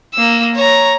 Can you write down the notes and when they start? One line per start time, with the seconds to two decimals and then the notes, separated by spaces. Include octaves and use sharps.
0.14 A#3 E6
0.55 C#5 A#5